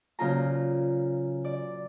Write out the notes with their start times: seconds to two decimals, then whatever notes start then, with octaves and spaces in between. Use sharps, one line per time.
0.19 A#2 C#3 F#3 F4 C5 A#5
1.44 D5